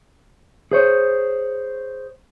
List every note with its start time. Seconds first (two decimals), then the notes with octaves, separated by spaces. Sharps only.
0.72 G#4 C5 C#5